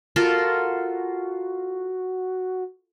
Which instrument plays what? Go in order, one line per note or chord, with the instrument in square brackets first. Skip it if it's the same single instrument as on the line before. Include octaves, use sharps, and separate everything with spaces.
[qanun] F4 A4 A#4 [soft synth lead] F#4